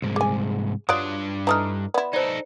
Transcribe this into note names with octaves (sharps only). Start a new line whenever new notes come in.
C2 G#2
G#4 G#5 D6
G2 F#3 D4 F4 D5 D#6 F#6 D7
E3 A3 D#4 A#5 D#6 F6
B3 E4 D5
D#4 A4 C5 D5